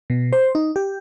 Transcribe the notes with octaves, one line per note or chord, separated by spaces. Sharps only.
B2
C5
D#4
G4